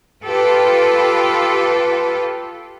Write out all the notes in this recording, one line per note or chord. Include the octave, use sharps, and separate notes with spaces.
F4 G4 A4 B4